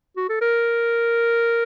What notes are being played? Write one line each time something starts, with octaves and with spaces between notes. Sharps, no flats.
F#4
A4
A#4